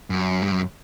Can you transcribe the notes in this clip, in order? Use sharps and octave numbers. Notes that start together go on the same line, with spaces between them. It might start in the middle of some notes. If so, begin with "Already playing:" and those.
F#2
G2
F#2